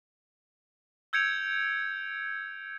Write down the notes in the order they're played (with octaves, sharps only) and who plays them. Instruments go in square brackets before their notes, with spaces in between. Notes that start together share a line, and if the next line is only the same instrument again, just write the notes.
[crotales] E6 G6 G#6 C#7 D7 F7